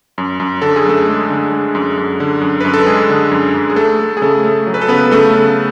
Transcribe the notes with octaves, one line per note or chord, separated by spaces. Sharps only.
F#2
F#2
D3 A4
G#4
F#2 A3 A4
G#3
D3
G#3
F#2
F#2
D3
F#2
F#2 B4
A4
G#3 G#4
D3
F#2
F#2
G#4
A3 A4
A3
G#4
C#3 A3 A4
A3
F#3
B4
A4
C#3 B3 B4
C#3 A3 A4
C#3